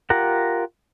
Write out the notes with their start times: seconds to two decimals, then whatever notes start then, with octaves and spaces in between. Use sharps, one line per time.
0.10 F4 G4 A#4 F#5